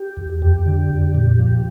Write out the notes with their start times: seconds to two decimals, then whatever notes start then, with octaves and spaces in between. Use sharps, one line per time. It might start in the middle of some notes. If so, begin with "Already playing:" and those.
Already playing: G4
0.17 E2
0.42 F2 G4
0.66 D3
0.89 F2
1.15 A#2
1.39 F3